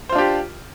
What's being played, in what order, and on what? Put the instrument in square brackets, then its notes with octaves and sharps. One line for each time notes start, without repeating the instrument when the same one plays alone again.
[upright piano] C5
F4
D4
G4